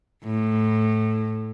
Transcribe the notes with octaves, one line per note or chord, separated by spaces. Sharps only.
A2